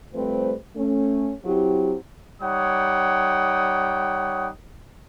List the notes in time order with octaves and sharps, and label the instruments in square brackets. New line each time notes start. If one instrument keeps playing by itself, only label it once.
[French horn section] F3 G3 A3 C4 B4 C5
A3 C#4
F#3 C4 E4 G4
[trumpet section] G3 D#4 C#5 F#5 G5 D#6